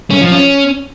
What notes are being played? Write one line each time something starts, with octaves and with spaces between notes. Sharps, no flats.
C#4
F3
C#4